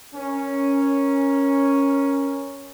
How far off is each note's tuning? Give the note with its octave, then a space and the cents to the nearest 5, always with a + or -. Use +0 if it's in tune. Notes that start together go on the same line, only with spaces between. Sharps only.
C#4 +0 A#4 +10